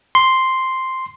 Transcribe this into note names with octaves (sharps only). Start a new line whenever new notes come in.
C6